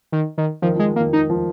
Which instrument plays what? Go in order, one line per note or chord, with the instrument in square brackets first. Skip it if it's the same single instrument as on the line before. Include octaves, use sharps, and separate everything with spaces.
[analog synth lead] D#3
D#3
[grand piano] D#3 [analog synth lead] F3
[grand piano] F3 [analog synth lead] G#3
[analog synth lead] A#3
[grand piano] D#3
[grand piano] D#3 [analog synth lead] D#4
[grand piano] F3